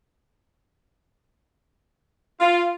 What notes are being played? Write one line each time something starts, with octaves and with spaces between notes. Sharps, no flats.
F4